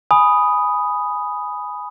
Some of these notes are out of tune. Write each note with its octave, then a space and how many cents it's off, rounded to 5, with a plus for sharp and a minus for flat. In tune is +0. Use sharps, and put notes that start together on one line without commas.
G#5 +0 B5 +0 D#6 +0